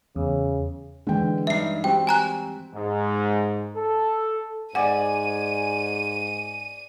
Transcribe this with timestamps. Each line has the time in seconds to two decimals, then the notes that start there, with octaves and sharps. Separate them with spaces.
0.16 E2 C#3
1.07 D3 E3 G#3 G5
1.47 G2 D#4 E5 C7
1.84 G3 C4 F#4 G5
2.07 G#5 A#5 F#6
2.74 G#2
3.76 A4
4.75 G#2 D5 F#5 G#5 D#7